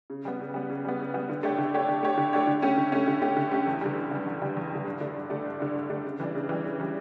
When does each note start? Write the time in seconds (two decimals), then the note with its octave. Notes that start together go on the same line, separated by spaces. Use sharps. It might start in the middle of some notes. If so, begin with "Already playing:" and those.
0.10 C#3
0.25 G3 B3
0.39 C#3
0.54 G3 B3
0.70 C#3
0.85 G3 B3
0.99 C#3
1.14 G3 B3
1.29 D3
1.43 A3 D4 G4 C#5
1.58 D3
1.74 A3 D4 G4 C#5
1.88 D3
2.03 A3 D4 G4 C#5
2.17 D3
2.33 A3 D4 G4 C#5
2.47 D3
2.62 A3 C#4 G4
2.77 D3
2.92 A3 C#4 G4
3.08 D3
3.22 A3 C#4 G4
3.37 D3
3.51 A3 C#4 G4
3.67 E2
3.81 D3 G3
3.96 E2
4.11 D3 G3
4.26 E2
4.42 D3 G3
4.57 E2
4.71 D3 G3
4.85 G2
5.00 D3 A3 D4
5.16 G2
5.30 D3 A3 D4
5.46 G2
5.60 D3 A3 D4
5.75 G2
5.90 D3 A3 D4
6.05 C#3
6.20 E3 G3 D4
6.35 C#3
6.49 E3 G3 D4
6.64 C#3
6.80 E3 G3 D4